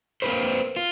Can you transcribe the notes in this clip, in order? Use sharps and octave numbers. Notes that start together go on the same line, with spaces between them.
A#3 C4 F4 G#4 B4 C5
F4